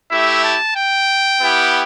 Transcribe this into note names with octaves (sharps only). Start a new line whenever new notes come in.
A3 E4 G4 E5
A5
G5
B3 E4 G4